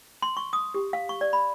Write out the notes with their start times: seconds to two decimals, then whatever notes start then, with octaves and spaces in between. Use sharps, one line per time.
0.22 C6
0.37 C#6
0.53 D#6
0.74 G4
0.93 F5
1.09 C#6
1.21 D5
1.33 B5